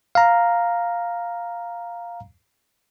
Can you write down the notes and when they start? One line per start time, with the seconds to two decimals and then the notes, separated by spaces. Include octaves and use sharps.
0.15 F5 A#5